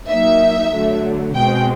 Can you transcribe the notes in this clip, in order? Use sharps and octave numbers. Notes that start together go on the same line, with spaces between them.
F#3 A#3 D#4 E5
D3 F#3 A3
B2 G#3 C4 G5